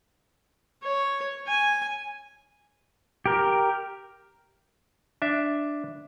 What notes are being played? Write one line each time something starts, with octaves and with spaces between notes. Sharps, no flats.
C#5
G#5
G4 A#4
D4 E5